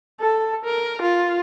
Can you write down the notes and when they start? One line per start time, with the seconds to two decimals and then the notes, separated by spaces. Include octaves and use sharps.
0.20 A4
0.65 A#4
1.02 F4